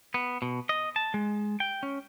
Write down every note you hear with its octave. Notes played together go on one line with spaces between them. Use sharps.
B3
B2
D#5
A5
G#3
G5
C#4